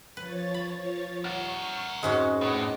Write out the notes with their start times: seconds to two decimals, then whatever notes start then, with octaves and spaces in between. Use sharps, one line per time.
0.17 F3 B4 C#5 A6
0.54 B5
1.24 A#4 F#5 C#6
2.03 F2 G#2 G#3 C#4 F#4
2.41 A2 B3 D#5 D6